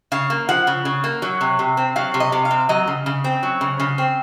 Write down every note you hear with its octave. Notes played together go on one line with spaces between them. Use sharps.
C#3 F5
A#3
F3 F#5
C#3
C#3
A#3
F#3
C3
C3
C4
F#3 F5
C3
D#5
C3
F5
C4
F#3 D#5
C#3
C#3
C4
F#3
C#3
C#3
C4